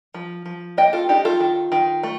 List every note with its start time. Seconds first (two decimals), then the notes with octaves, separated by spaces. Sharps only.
0.14 F3
0.46 F3
0.77 A#3 D#5 G5
0.93 F4 A4
1.09 D4 D#4 G4
1.25 F4 A4
1.40 D#3
1.72 D#3
2.03 A3